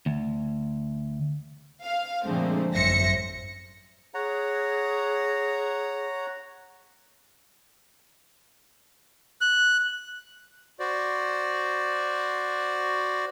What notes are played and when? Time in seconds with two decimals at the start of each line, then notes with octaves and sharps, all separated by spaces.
0.06 D2
1.85 F5
2.24 A#2 D3 F3 G#3 A3 C4
2.73 G#1 F#2 C5 E5 A#6 C#7
4.14 G#4 C#5 F#5 A#5
9.41 F#6
10.80 F#4 C5 D5